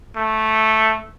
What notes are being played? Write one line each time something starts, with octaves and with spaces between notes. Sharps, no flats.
A3